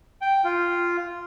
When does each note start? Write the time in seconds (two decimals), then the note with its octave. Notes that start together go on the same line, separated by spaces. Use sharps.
0.21 G5
0.44 F4